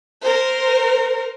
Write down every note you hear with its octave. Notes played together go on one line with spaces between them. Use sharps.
A#4 C5